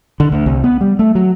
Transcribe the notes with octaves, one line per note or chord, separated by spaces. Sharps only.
D3
D2
C2
B3
G3
A3
F#3